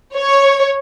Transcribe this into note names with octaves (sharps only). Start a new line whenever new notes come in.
C#5